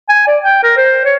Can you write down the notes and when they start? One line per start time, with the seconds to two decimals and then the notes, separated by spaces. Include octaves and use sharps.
0.09 G#5
0.27 D5
0.44 G5
0.63 A#4
0.77 C5
1.05 C#5